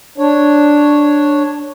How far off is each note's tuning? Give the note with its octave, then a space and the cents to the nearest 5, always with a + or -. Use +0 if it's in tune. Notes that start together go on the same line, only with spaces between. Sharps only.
D4 +0 C#5 +0